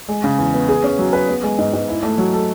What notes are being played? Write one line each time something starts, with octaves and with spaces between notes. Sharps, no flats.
G#3
C#3
E2
B3
G#4
C#4
F#3
B4
B3
G#3
G#2
G#2
E4
A3
F#3
A4